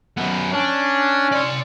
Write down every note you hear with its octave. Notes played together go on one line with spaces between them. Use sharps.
F#2 B3
C#4 D4
D5 C6